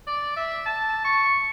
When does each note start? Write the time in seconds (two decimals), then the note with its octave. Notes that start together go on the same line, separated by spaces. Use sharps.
0.07 D5
0.37 E5
0.66 A5
1.05 C#6